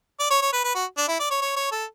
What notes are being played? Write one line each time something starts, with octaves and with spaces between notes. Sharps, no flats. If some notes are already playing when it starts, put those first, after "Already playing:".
D5
C#5
C#5
B4
B4
F#4
D4
E4
D5
C#5
C#5
C#5
A4